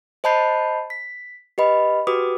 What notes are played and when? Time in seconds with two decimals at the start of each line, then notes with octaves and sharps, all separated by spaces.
0.24 C5 D#5 A5 B5 G6 C7
0.90 B6
1.58 G4 B4 D#5 B5
2.07 F#4 G4 B4 D6 D#6